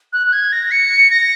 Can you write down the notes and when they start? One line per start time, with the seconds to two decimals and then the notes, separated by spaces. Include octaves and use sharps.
0.13 F#6
0.27 F#6
0.33 G#6
0.52 A#6
0.71 C#7
1.11 A#6